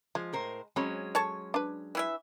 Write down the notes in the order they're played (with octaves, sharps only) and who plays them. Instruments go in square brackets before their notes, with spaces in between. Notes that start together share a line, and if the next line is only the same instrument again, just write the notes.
[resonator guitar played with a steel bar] F3 [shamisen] G#3
[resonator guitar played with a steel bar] A2 A#4 C5
[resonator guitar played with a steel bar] F#3 G#3 C#4 [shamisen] C4 C#5 B5
[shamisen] A4 [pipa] C#5 A5 C#6
[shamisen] D4 B4
[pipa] E3 E4 E5